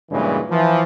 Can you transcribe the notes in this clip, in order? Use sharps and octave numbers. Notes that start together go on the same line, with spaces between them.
G2 A#2 C#3 E3 F#3 G#3
E3 F3